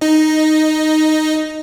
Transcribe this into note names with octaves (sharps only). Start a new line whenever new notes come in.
D#4 D#5